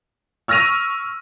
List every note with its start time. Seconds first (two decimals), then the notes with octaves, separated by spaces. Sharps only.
0.48 C#6 E6 F6 A#6 D#7 F7